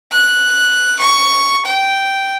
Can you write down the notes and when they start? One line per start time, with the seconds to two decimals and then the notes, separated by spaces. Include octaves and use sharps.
0.12 F#6
0.99 C#6
1.65 G5